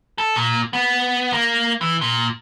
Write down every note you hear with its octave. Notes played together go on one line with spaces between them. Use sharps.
A4
A#2
B3
A#3
E3
A#2